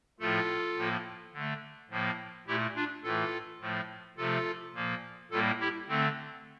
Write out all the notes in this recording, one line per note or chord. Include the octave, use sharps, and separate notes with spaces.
A2 F3 A3 F4 A4
A2 F3 A#3
D3 A3
A2 F3 A#3
A#2 A3 E4 G4
D4 F4
A2 E3 A3 F4 A4
A2 F3 A3
C3 F3 A3 F4 A4
A#2 F3 A#3
A2 G3 A#3 F4 A4
E4 G4
D3 A3 C4